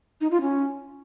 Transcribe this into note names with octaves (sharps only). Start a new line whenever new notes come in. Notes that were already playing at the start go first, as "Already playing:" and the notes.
D#4
F4
C#4